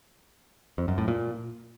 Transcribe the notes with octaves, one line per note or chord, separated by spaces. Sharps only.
F2
F#2
A2
A#2